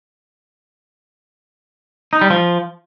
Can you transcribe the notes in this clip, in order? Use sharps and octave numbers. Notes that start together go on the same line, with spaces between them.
D#4
G3
F3